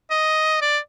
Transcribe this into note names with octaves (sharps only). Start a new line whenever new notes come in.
D#5
D5